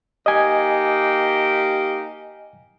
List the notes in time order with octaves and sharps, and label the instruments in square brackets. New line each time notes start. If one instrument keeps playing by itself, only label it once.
[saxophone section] A#3 D#4 G4 [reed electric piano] D#5 G#5